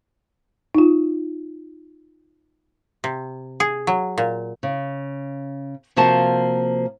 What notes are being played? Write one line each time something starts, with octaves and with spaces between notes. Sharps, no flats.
D#4 F4
C3
G#4
F#3
A#2
C#3
C3 F3 A#3 F#4 A5